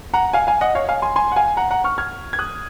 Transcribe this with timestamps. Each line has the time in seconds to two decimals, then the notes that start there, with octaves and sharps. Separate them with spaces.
0.14 F#5 A#5
0.33 F5 G#5
0.47 F5 G#5
0.61 D#5 F#5
0.75 C#5 F5
0.89 F5 G#5
1.02 G#5 C6
1.16 G#5 C6
1.32 F#5
1.36 F5 G#5
1.57 F#5 A#5
1.71 F#5 A#5
1.84 C#6 F6
1.98 F6 G#6
2.33 G#6
2.39 D#6 F#6